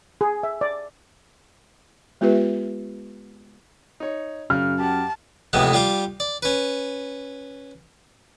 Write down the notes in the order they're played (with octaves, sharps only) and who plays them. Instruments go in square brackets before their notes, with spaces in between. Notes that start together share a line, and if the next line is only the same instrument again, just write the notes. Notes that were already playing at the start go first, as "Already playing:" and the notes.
[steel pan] G#4
E5
D5
[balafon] G#3 B3 F4 G4 B4 E5
[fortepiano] D#4 C#5
[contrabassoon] F#2 [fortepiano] C#3 [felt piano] F6
[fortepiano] G4 F#5 [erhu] A5
[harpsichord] F2 A2 C3 E3 G#3 B3
G3 F4 F5 D6
D5
C#4 B4